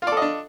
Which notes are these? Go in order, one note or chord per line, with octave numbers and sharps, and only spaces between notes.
D4 F4 A4 D5 D#5